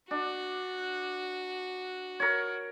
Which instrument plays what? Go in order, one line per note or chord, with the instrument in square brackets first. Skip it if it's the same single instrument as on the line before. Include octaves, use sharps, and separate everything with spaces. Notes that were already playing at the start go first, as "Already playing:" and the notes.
[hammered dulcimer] D4 [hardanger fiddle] F#4
[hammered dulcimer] A#4 C#5